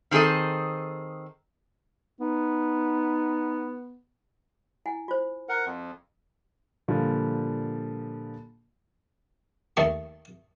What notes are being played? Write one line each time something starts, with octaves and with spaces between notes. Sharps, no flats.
D#3 C4 G#4 A4 D#5
B3 D#4
E4 F#5 G#5
F4 C5
A#4 F#5
F2
A#2 D3 F3 G3
D#2 D#3 A3 A5 C#6